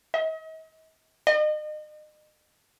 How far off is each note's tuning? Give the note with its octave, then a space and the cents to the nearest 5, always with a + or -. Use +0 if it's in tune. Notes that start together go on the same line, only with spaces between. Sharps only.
D#5 +40
D#5 -35